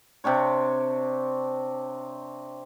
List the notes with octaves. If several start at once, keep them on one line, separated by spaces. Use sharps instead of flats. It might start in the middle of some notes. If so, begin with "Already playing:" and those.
C3 C4 D4 C#5